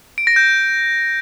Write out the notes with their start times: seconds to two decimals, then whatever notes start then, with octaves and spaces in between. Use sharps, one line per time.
0.18 D7
0.27 A#6
0.36 G6